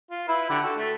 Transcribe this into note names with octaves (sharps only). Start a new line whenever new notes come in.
F4
E4 B4 E5
D3 G4 F#5
F#4 A4
A3